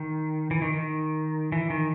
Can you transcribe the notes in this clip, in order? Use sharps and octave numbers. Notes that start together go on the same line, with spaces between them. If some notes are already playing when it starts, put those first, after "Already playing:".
Already playing: D#3
E3
D#3
D#3
E3
D#3